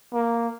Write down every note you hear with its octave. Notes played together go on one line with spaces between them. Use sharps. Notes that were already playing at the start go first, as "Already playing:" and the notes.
A#3